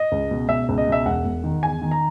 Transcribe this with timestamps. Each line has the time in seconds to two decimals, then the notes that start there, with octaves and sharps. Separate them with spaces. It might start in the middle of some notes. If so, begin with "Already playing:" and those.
Already playing: D#5
0.12 C#2
0.31 B2
0.49 B2 E5
0.69 C#2
0.78 D#5
0.87 B2 E5
1.06 E1 F#5
1.25 E1
1.44 D#3
1.63 E2 G#5
1.82 D#3
1.91 A#5